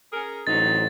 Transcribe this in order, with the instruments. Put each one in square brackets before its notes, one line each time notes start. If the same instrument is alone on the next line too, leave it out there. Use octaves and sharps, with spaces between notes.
[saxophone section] C#4 G#4 A#4
[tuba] A1 [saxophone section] F#3 C4 D#4 [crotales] A6